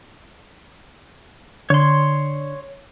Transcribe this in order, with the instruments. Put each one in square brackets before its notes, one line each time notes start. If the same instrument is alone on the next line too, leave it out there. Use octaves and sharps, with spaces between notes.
[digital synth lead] D3 [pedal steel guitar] C#5 C6